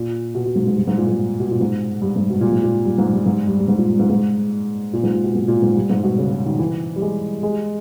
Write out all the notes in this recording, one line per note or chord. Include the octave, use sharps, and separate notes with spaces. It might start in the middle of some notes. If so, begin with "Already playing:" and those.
Already playing: A#2
B2
B2
G#2
G#2
G2
G#2
A#2
G#2
B2
A#2
G#2
G2
G#2
B2
A#2
G#2
A#2
G2
G#2
G2
G#2
G2
G2
G#2
A#2
G#2
G#2
A#2
G#2
A#2
B2
G#2
A#2
G#2
G2
G#2
B2
C#3
B2
D#3
E3
G3
G#3
G#3